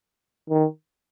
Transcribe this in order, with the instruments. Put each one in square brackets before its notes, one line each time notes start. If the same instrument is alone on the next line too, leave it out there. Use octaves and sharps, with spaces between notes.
[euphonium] D#3